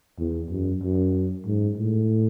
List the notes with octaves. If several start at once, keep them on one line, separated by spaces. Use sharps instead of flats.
E2
F#2
F#2
G#2
A2